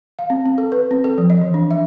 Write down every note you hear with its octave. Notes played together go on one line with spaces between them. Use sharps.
F5
C4
C4
A4
B4
C4
A4
F3
D#5
E3
D4
E5